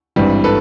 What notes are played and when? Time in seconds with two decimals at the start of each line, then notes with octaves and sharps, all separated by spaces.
0.16 G#1 G2 E3 G3
0.44 A4 B4